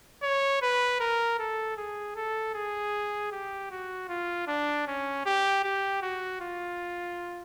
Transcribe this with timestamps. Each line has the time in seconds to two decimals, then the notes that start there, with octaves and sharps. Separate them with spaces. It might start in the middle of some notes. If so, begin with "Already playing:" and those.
0.23 C#5
0.62 B4
1.00 A#4
1.39 A4
1.77 G#4
2.16 A4
2.54 G#4
3.32 G4
3.71 F#4
4.09 F4
4.47 D4
4.87 C#4
5.26 G4
5.64 G4
6.02 F#4
6.41 F4